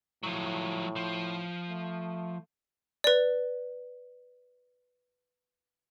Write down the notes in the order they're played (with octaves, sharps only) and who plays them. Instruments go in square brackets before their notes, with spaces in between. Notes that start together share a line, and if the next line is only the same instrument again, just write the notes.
[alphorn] A2 [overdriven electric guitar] F3 F#3
[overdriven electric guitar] F3
[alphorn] A3
[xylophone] B4 D5